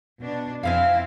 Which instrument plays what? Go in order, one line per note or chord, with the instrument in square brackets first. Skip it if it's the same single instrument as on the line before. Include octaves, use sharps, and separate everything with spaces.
[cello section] B2 D4
[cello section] F2 C4 E4 [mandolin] F4 F5 G#5